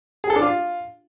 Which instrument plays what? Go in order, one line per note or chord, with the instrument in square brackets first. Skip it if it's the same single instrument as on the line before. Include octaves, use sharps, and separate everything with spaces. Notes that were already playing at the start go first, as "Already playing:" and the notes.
[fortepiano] G#4
A4
D4
F4